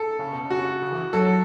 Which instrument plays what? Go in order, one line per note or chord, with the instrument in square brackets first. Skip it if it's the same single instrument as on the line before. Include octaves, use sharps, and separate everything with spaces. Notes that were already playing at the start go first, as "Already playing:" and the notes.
Already playing: [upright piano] A4
[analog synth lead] C#3
B2
C#3
[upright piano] F#4
[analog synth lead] C#3
E3
[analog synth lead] F#3 [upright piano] A4